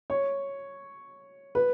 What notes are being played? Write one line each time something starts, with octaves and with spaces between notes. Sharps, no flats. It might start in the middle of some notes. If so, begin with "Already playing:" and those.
C#5
B4